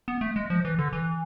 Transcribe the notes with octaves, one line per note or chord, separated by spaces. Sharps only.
B3
A3
G#3
F3
E3
D3
E3